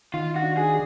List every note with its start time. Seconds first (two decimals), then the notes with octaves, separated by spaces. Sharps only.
0.14 D#3 F4
0.36 F#4
0.43 D4
0.57 G#4